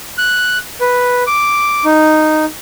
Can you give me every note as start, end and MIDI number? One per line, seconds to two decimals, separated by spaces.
0.18 0.58 90
0.81 1.23 71
1.27 1.85 86
1.85 2.45 63